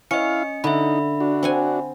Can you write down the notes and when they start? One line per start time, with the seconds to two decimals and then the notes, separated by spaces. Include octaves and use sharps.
0.11 C#4 E4 D#5 F5 C#7
0.64 D3 D#4 E5 B5
1.20 D4 F#4
1.43 C4 F#5 G#5